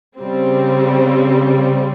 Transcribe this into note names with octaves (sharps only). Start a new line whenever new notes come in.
C#3 G3 C4